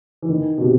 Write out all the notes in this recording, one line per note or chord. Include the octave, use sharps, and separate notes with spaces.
E3
D#3
B2
C3